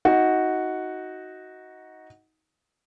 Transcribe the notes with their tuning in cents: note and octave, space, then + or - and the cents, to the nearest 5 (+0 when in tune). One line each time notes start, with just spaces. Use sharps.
D#4 +20 F#4 +0